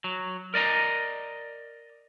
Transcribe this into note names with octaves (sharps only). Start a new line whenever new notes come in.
F#3
A#4 D5 D#5 A#5